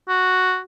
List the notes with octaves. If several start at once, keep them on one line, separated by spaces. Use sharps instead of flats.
F#4